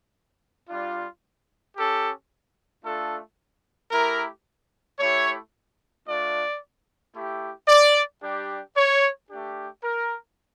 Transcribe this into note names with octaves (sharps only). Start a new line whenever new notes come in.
G3 D4 F4
C#4 G4 A4
A3 D4 F4 A4
A3 E4 G4 A#4
A3 E4 G4 C#5
A3 D4 F4 D5
A3 E4 G4
D5
G3 D4 G4
C#5
A3 D4 G4
A#4